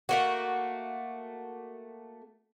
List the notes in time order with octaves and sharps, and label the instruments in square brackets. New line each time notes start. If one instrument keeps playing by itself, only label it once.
[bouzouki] A3 A#3 F#4